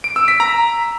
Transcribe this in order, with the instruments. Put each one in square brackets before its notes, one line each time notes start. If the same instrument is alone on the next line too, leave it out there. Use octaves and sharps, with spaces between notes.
[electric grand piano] D7
E6
B6
A#5